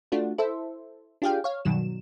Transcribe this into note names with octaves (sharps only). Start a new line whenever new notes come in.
A3 D4 F4 F#4
E4 A4 C5 E5
D4 F4 G4 G#4 F5 G5
C#5 F5
G2 B2 D#3 F#3 E7